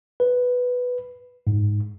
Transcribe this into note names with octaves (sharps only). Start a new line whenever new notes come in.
B4
G#2